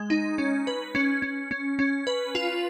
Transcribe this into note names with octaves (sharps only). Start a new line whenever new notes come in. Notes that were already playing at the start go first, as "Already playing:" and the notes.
Already playing: G#3
D#4
C#4
B4
C#4
C#4
C#4
C#4
B4
F4